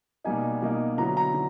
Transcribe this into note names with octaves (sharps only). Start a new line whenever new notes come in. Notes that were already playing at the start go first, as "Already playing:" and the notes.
B2 G3 A#3 D#4 G#5
B2 G3 A#3 D#4
D3 F#3 B3 E4 A#5
A#5
D3